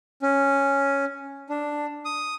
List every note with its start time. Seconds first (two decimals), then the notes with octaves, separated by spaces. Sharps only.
0.22 C#4
1.50 D4
2.05 D#6